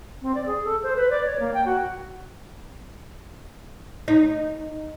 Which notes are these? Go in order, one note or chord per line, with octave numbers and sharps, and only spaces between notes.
C4
D5
G#4
A4
C5
B4
D5
C#5
A#3
G5
F#4
D#4